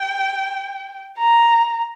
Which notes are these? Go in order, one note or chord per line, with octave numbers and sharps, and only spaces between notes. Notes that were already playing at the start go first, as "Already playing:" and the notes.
Already playing: G5
A#5